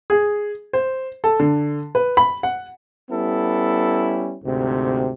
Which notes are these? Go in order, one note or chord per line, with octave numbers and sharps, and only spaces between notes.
G#4
C5
A4
D3
B4
B5
F#5
G3 B3 C#4 E4 A4
D2 G#2 C3